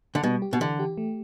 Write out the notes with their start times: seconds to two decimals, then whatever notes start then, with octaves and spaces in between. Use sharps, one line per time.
0.15 D3
0.23 B2 G3
0.42 G4
0.53 B2
0.60 D3 E3
0.79 G4
0.98 A3